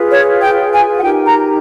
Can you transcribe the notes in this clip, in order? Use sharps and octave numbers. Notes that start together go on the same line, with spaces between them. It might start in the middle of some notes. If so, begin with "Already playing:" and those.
Already playing: F4 G#4 B4
C#5
G5
G#5
F#5
D#4 G4 A#4 G5
A#5